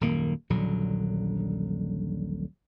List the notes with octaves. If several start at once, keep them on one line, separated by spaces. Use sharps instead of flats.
D#1 F#2 D#3 A#3
D#1 A#1 D3 F#3